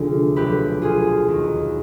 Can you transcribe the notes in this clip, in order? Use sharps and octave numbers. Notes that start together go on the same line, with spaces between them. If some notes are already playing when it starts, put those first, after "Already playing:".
Already playing: D2 C3 F3 F4 G#4
B1 B2 G4 B4
F4 G#4
D#2 D#3